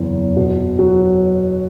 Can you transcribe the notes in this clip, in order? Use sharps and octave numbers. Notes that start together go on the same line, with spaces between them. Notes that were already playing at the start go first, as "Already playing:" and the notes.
Already playing: F#1 E2
B2
F#3